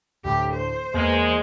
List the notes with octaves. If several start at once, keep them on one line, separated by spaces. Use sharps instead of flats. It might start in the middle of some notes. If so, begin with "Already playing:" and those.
D2 A2 G4
C5
E2 G#3 A#3